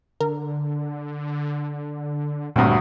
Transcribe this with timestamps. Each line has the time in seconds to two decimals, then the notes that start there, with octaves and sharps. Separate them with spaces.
0.20 D3 A#4
2.56 D2 G2 A#2 F#3 C4 D#6